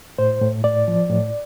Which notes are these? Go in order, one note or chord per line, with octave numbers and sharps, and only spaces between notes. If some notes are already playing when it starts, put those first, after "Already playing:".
A2 C5
A2
A2 D5
F3
A2